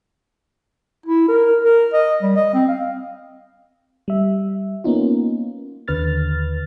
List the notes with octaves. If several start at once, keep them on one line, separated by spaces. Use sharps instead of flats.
E4
A#4
A#4
D#5
G3
D#5
C4
F5
G3 E5
A#3 B3 C#4 D#4 F4
D#2 D3 B4 F6 A6